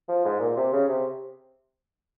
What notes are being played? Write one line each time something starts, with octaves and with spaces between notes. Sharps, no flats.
F3
G#2
A#2
C3
C#3
C3